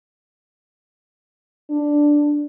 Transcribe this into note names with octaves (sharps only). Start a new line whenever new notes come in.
D4